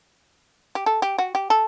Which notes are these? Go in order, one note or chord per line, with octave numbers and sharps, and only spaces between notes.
G4
A4
G4
F#4
G4
A4